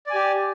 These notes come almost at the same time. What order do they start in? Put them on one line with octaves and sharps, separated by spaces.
D5 G#5 G4